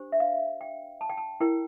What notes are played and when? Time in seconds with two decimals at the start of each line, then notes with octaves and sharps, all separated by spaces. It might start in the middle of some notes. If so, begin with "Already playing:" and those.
Already playing: D4 G4 C5
0.12 E5
0.20 F5
0.61 G5
1.01 A5
1.10 G5
1.17 A5
1.40 E4 A#4 G5